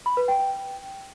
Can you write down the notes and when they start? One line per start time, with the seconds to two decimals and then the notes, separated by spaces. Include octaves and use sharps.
0.06 B5
0.17 B4
0.28 G5
0.39 G5